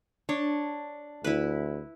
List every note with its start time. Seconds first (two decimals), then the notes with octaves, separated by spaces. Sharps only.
0.29 D4 C#5
1.24 D2 E4 B4